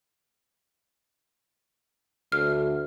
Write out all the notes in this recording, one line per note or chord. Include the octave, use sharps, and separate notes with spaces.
D2 F6